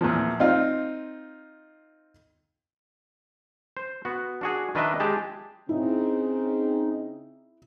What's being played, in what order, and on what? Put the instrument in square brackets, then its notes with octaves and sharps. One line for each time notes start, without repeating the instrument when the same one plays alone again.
[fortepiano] E2 A#2 E3 F3
C4 D#4 F4 F5
[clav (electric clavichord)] C5
B3 F#4
D4 F#4 G#4
D#3 D4 A#4 B4 D#5 E5
G#3 G4 G#4 A5
[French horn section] C#3 C4 G#4 [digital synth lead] D#4 [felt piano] E4